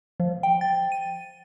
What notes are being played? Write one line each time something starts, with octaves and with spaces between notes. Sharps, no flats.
F3
G5
A6
D#7